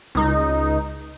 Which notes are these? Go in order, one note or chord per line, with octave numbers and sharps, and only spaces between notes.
C#2 D#4